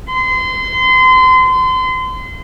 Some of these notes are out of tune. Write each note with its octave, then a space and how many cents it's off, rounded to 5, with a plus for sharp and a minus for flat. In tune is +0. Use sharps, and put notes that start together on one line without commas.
C6 -30